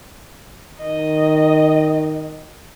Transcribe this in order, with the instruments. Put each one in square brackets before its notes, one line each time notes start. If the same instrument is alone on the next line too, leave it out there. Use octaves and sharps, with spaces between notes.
[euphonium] D#3 [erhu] D#5